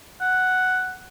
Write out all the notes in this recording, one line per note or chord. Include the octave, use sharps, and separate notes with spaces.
F#5